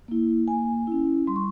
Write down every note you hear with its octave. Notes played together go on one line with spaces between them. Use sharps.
A#3 E4
A#3 G#5
C#4 E4
G3 C6
C#6